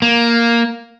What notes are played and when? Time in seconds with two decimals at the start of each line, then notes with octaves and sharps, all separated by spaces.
0.02 A#3